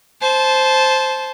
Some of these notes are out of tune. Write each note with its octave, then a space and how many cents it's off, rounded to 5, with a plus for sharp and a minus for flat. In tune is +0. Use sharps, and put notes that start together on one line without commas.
C5 +0 A5 -20